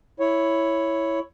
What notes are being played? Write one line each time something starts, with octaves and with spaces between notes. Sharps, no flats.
E4 C#5